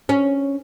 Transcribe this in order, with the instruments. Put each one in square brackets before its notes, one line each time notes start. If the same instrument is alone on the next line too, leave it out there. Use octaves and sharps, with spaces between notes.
[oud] C#4